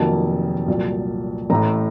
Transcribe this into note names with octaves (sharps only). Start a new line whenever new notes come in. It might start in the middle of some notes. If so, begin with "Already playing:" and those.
Already playing: F1 F2 D#3 F#3 A#3 A5
C2 A#2 F#3
A1 A2 A3 A#5